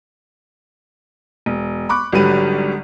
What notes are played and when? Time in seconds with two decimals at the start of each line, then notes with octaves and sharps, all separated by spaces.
1.46 E1
1.89 B5 C#6 D6 F#6
2.13 G#1 D3 F#3 G3 B4 D#7